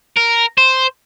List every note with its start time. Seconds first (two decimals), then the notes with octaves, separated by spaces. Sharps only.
0.17 A#4
0.58 C5